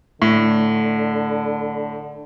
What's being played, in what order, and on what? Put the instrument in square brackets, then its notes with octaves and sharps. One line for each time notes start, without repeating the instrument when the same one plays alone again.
[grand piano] A2 [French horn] D3